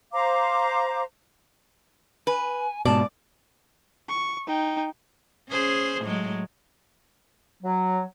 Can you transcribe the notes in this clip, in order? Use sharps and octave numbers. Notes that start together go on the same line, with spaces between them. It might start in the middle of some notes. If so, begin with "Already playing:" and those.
C5 F5 A#5 D6
B4 G#5
G#2 B2 D5 A5
C#6
D#4 G5
C#4 G#4 C5
A2 F#3 G#3
F#3